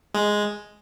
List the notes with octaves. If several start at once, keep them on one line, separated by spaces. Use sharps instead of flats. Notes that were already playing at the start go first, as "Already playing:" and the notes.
G#3